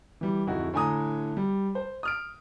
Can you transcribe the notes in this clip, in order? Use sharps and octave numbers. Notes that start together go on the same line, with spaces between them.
E3 G3
D1 F2 D#4 E4 F#4
A2 D3 G#5 A#5 D#6
G3
C5
D#6 F6 D7